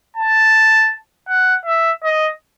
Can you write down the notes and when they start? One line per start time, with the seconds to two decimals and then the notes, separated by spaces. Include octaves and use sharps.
0.17 A5
1.28 F#5
1.65 E5
2.04 D#5